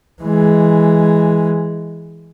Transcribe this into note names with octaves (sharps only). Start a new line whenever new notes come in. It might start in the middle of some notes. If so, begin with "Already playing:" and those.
E3 G#3